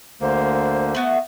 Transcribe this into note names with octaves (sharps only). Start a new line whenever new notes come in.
D2 D3 A#3 C5
A3 B3 F#4